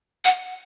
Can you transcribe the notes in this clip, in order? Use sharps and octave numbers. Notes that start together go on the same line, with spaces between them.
F#5